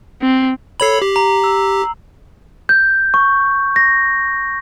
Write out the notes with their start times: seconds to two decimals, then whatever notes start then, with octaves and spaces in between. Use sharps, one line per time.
0.22 C4
0.80 A4 C#5 B5 C7 F#7
1.02 G4
1.16 A#5
1.44 E6
2.69 G6
3.14 C#6
3.76 A#6